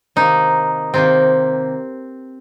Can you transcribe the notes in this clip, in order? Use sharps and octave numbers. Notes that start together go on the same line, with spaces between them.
C3 D#3 A#3 D#4
C3 D#3 A#3 C4